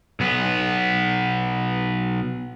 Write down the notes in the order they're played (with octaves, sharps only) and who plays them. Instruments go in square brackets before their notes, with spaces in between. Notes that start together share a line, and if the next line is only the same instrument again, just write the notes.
[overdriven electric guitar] B1 B3